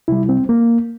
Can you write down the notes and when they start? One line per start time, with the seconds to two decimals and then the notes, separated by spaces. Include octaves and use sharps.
0.08 C3 G3 E4
0.29 C4
0.49 A#3